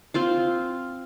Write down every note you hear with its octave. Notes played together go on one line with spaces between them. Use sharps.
C4 F4 F5